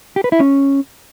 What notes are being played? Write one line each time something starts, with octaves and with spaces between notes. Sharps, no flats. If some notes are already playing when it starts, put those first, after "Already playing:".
G4
B4
E4
C#4